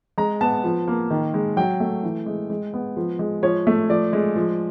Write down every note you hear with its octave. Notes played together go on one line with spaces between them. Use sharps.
G#3 A#5
B3 A5
F3
A#3
D#3
G#3
F#3 G5
A3
E3
G#3
G#3
B3
F3
G#3
F3 C#5
A3
F3 D5
G#3
F3